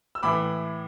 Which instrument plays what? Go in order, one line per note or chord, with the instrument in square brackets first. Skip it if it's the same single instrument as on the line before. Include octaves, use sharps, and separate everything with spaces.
[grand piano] E6
A2 E3 B5 D6